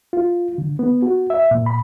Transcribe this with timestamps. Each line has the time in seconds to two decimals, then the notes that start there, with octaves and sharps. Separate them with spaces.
0.13 F4
0.58 D3
0.79 B3
1.02 F#4
1.30 E5
1.51 A#2
1.66 B5